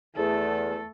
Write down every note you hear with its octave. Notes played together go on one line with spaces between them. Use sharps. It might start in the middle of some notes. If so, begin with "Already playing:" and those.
E2 A3 A4